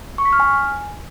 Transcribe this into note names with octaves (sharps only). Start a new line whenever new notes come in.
C#6
B6
F6
G#5